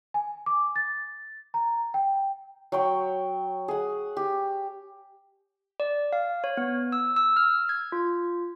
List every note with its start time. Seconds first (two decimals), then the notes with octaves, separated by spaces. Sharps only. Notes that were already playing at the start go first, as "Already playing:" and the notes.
0.14 G#5
0.46 D6
0.76 A6
1.54 A#5
1.94 G5
2.72 F#3 G5 C#6
3.68 G#4 F#5
4.17 G4
5.80 D5
6.13 F5
6.44 C#5
6.57 B3
6.92 E6
7.16 E6
7.36 F6
7.69 G#6
7.92 F4